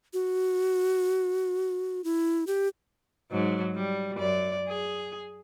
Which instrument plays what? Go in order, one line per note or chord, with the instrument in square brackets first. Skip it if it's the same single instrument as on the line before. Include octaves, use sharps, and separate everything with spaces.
[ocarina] F#4
E4
G4
[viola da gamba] G#2 F#3
G3
F#2 D5
G#4